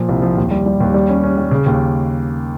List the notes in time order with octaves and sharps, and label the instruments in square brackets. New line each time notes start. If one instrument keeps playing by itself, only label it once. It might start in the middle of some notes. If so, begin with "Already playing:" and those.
Already playing: [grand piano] A#2 F3
C2
F3
D#2
G3
G3
D#2
G3
C#4
C#4
G3
C#3
D#2